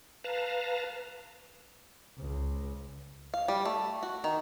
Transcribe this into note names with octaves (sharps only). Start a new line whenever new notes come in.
B4 F5 A5 A#5
C#2
F5
G3
A3
F#4
D#3